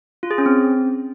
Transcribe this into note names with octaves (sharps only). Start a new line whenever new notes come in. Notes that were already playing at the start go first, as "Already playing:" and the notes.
F4
G#4
C#4
C4